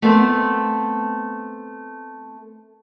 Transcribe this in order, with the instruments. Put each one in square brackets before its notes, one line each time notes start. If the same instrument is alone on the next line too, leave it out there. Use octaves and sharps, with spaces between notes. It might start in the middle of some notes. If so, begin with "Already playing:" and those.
[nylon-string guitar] A3 B3 C4